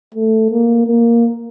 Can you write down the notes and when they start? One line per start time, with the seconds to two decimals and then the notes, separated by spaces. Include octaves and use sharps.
0.14 A3
0.50 A#3
0.87 A#3